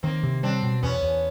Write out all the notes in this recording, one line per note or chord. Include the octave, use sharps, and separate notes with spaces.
D#3 A#3 C4
C3
G3 C4 D4
B2
E2 B3 C#4
E2